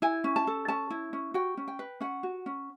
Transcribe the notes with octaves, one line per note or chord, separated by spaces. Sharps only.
E4 G#5
C#4
A5
A4
C#4 A5
E4
C#4
F#4 G5
C#4
G5
B4
C#4 F#5
F#4
C#4